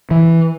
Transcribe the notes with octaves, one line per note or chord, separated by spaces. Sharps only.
E3